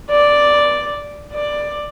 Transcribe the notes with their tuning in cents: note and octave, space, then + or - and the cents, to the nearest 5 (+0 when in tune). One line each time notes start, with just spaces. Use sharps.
D5 +0
D5 +10